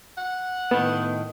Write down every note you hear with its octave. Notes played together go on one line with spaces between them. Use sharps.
F#5
A2 D#3 B3